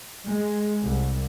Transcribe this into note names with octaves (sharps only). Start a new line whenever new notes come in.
G#3
C2